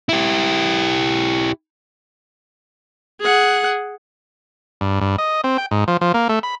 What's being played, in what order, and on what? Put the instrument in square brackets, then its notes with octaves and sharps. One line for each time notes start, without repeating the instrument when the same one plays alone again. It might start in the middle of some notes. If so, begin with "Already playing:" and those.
[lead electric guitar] E4 G4
[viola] G#4 F#5
[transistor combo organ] G2
G2
D#5
C4
G5
G#2
F3
F3
A#3
A3
B5